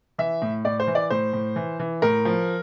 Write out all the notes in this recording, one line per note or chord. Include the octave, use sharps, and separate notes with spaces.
E3 E5
A2
A2 D5
C5
E3
D5
A2 C5
A2
E3
E3
A2 A#4
F3